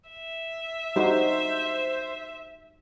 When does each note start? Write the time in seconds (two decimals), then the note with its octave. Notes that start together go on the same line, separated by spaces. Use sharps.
0.10 E5
0.96 G3 D#4 F#4 C5